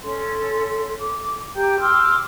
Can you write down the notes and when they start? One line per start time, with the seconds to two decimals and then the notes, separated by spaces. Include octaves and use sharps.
0.01 C#4 A4 C6
1.00 D6
1.55 G4 G5 A#5 G6
1.79 C6 D6 E6 F6